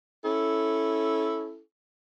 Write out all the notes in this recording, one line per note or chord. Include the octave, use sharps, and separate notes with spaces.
C#4 E4 A4